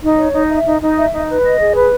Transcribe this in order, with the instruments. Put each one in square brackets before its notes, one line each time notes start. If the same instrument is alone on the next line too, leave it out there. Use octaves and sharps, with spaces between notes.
[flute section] D#4
C#5
D#4
E5
D#4
D#4
E5
D#4
B4
D#5
G#4
B4